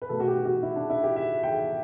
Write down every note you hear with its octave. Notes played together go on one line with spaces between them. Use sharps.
B4
B2 A3 A4
F#4
G4
F#4
E4
D4
E4
G4
E5
G5